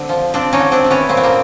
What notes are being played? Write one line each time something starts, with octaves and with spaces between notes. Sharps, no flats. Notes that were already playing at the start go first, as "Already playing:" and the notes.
Already playing: D3 C4
F3
F3 C4 D4
C#4 D#4
D3
C4 D4
A3
B3 C#4
A#2 C4
B3
A#3 C4